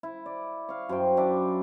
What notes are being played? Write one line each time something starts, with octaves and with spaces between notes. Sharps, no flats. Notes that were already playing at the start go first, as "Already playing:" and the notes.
E4
D5
F5 C#6
F#2 C5 G5
D4 E4 D5 E5